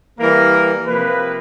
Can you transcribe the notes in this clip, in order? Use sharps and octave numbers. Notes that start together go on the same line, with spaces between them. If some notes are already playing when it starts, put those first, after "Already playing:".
E3 G3 A#3 A#4
C3 F3 A#3 B4